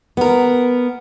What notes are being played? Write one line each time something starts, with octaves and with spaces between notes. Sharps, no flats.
B3 A#4